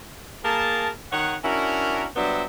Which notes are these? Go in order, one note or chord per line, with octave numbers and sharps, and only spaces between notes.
A#3 G#4 A#4 A5
D#3 D#4 C#5 F#5
C#4 D4 E4 F#4 A#4
F#3 G3 B3 D4 C5 E5